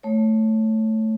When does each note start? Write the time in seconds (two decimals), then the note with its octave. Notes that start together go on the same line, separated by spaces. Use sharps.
0.03 A3 C#5